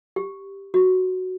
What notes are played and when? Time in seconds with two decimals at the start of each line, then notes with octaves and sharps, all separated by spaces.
0.16 G4
0.74 F#4